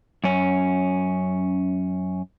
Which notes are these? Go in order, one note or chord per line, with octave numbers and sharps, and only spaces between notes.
F#2 C#4